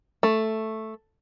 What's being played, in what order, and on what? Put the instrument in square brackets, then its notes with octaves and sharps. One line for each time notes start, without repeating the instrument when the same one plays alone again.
[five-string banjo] A3